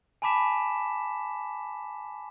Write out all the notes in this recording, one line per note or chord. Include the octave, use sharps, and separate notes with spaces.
G#5 A5 B5 D6 B6 E7